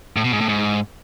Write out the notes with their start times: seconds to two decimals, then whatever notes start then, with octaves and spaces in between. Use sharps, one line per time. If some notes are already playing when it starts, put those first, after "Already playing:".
0.16 A2
0.24 B2
0.33 G#2
0.41 A2
0.49 G#2